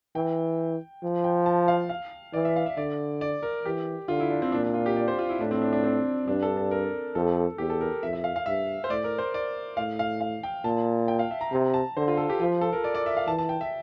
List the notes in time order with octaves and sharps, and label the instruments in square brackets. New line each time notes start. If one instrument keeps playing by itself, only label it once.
[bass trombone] E3 [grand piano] G5
[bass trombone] F3
[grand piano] G5
A5
F5
F5
[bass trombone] E3 [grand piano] D5
[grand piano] E5
F5
E5
[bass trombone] D3 [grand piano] D5
[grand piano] D5
A#4
[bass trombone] E3 [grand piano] G4
[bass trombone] D3 [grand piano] F4
[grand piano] E4
D4
C4
[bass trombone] A#2 [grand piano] D4
[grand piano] D4
F4
G4
D5
C5
F4
E4
[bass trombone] A2 [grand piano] D4
[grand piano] C4
D4
D4
C4
[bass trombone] G2 [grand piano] D4
[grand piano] A4
A4
A#4
[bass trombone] F2 [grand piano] A4
[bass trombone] E2 [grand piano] G4
[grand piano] A4
A#4
[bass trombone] F2 [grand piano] E5
[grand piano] E5
F5
F5
[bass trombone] G2 [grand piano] E5
[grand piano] C5
[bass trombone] A2 [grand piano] D5
[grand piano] A#4
C5
D5
[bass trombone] A2 [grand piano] F5
[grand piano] F5
F5
G5
[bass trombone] A#2 [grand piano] A5
[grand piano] G5
F5
E5
A#5
[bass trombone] C3 [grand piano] A#5
[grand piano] A5
[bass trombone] D3 [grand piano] C5
[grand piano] F4
A4
G4
[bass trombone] F3 [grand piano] F4
[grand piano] A4
A#4
D5
D5
E5
F5
[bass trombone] E3 [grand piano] A5
[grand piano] A5
G5
E5